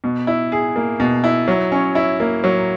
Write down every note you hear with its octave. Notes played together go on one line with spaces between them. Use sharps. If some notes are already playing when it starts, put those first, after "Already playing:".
B2
E4
G#4
A#3
B2
E4
F#3
C#4
E4
A#3
F#3